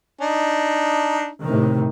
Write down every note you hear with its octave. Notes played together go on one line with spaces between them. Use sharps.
D4 D#4
A2 C3 D#3